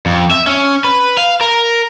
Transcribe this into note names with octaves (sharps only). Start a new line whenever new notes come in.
F2
E5
C#4
B4
F5
A#4